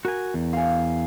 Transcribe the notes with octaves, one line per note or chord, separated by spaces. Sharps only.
F#4 A#4 G#5
E2
F5 G#5